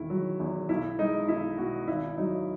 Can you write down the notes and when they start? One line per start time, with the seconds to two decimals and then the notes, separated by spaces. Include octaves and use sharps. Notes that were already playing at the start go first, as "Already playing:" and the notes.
Already playing: E1 D#3 E4
0.10 F#3
0.40 E2
0.69 B1 E4
0.99 G#3 D#4
1.28 B1 E4
1.58 B2 F#4
1.88 G#1 E4
2.17 F#3 D#4